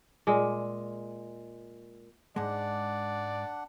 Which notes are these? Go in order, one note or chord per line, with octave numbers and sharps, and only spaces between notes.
A#2 G#3
G#2 G#3 D4 D5 F#5